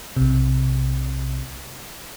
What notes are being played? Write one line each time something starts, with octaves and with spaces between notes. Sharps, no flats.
B1 C3